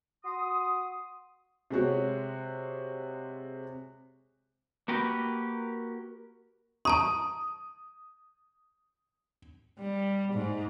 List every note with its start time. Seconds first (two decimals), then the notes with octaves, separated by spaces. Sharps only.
0.24 F#4 C6 D#6
1.70 C3 G#3 F#4 C#5
4.88 A#3 F#4 G4 A#4 B4
6.85 A5 A#5 C#6 D#6
9.79 G3
10.33 G#2